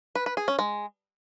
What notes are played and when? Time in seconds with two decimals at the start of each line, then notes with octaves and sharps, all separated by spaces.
0.15 B4
0.26 B4
0.37 G#4
0.48 C#4
0.59 G#3